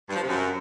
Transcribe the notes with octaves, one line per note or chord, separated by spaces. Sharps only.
G2
F3
C3
F#2